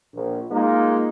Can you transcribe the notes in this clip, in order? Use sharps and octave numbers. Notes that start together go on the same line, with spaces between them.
A#1
G#3 A#3 D#4 F4